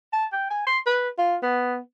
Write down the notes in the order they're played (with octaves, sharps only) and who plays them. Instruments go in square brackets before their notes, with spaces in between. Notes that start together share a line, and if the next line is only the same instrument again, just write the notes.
[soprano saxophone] A5
G5
G#5
C6
B4
F4
B3